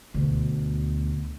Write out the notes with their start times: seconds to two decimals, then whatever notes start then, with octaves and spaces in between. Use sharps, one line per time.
0.14 D2 B2